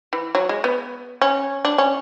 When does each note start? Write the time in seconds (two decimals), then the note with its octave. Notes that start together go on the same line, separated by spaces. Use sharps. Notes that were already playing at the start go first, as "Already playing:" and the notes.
0.13 E3
0.35 F#3
0.49 G#3
0.64 B3
1.22 C#4
1.65 D4
1.78 C#4